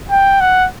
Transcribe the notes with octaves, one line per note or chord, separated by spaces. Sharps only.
G5
F#5